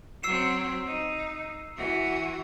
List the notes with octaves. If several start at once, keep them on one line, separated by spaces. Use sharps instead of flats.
F#3 C4 E6 C7 E7
D#4
E3 F#4